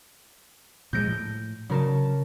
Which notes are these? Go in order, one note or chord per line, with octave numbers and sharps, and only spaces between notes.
A#2 F3 G#3 G6 A#6 D7
A2
C#3 F#3 A#4 A5